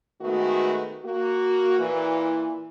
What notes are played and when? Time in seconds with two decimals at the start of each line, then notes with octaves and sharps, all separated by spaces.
0.21 D#3 G#3 A3 B3 F#4
1.05 A#3 F#4
1.79 A#2 E3